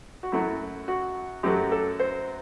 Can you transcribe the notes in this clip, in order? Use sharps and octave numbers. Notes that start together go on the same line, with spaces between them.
F#4
F#2 F#3 A3 E4
F#4
F#2 F#3 A3 G4
A4
C5